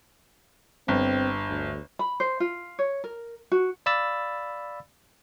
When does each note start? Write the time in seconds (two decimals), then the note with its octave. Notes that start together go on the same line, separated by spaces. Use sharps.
0.88 G1 C4
1.50 D2
1.99 B5
2.20 C5
2.40 F4
2.79 C#5
3.04 A#4
3.52 F#4
3.86 D5 F5 B5 E6 A6